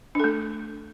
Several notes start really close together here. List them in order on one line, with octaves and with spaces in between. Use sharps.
D4 A4 A3